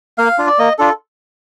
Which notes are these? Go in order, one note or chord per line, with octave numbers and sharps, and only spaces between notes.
A#3 F5
D4 F4
D5
A#3 D#5
D4 F4 A4